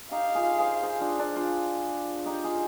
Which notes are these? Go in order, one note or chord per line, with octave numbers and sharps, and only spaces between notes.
D#4 G4 F5
F4 G#4
G#4 C5
G#4 C5
D4 F4
D4 F4
D4 F4
D#4 G4
F4 G#4